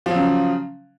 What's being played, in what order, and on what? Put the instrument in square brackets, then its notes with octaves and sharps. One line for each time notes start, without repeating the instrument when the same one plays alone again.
[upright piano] F3
F#3
C#3